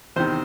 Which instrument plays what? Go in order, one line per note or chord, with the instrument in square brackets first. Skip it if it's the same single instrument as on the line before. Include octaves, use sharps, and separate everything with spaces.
[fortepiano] E2 C3 D#3 C5